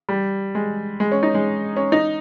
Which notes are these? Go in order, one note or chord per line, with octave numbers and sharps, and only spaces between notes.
G3
G#3
G#3
C#4
D#4
G#3
C#4
D#4